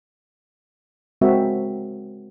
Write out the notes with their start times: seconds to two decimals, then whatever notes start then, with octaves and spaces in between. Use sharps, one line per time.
1.21 G#3 C4 F#4 A#4 E5